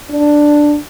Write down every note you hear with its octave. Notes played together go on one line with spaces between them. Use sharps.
D4